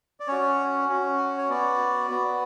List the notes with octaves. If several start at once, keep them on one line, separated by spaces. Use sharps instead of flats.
D5
C#4 F#4 C#5
C#4 F#4
C#5
B3 F#4 D5
B3 F#4